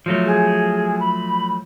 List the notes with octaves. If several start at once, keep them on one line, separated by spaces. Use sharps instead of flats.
F3 F#3 A3
G#4
B5